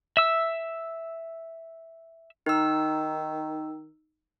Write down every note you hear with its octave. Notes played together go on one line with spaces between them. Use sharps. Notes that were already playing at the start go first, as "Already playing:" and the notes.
E5 E6
D#3 D#4 E6